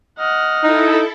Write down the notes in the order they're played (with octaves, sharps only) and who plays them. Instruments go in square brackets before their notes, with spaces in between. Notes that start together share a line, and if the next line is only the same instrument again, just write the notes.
[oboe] D#5 [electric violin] F#5 F6
[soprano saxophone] D#4 [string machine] E4 A4